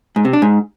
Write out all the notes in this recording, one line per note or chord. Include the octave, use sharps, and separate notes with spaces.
G#2
C3
D4
G#2